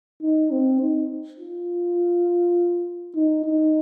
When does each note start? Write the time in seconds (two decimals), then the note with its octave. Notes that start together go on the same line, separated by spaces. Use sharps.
0.22 D#4
0.51 C4
0.81 D#4
1.39 F4
3.15 D#4
3.45 D#4